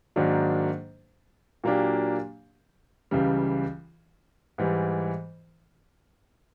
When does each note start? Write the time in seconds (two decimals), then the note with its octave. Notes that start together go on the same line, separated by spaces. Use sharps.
0.16 G#2 D#3 F#3 A#3 D4
1.64 A#2 F#3 A#3 D4 G4
3.11 C#2 C#3 E3 G3
4.58 G#2 E3 G3